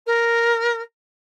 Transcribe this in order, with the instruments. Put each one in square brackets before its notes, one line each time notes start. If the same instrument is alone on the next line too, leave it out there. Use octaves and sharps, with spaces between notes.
[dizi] A#4